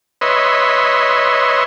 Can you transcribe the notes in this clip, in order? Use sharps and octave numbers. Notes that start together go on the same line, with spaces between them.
B4 C#5 D#5 E5 C6